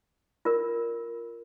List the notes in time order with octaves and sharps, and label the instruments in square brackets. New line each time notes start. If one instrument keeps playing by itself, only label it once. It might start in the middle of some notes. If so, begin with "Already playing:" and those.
[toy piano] F4 A#4 D5